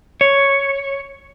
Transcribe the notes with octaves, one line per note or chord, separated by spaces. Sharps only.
C#5